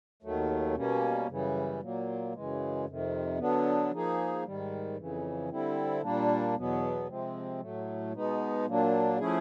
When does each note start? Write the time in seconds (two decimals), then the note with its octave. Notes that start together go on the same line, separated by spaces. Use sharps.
0.23 D#2 D#3 F#3 A3
0.74 B2 G3 A#3 C#4
1.27 F#2 C#3 E3 G3
1.80 A#2 F#3 A#3
2.33 F#2 C#3 E3 G#3
2.86 F2 C3 D#3
3.39 D3 F#3 B3 D4
3.91 F3 A#3 D#4 G#4
4.45 G#2 D#3 G3
4.96 F2 C#3 E3
5.49 D3 G3 C4 E4
6.02 A#2 G3 A#3 D4
6.55 E2 B2 F#3 B3
7.08 C3 F3 G#3 C4
7.60 A2 F#3 A3
8.13 B2 G#3 B3 D#4
8.66 A#2 F#3 A#3 D4
9.19 F3 A3 C#4 E4 G#4